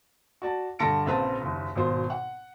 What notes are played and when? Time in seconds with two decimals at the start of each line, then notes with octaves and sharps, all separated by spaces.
0.42 F#4 D5 A5
0.79 G2 D3 A5 A#6 C#7 D7
1.06 A#1 C#3 C4 B4 F5 A5
1.41 F#1 D#2
1.75 G#1 B2 F4 C5
2.10 F#5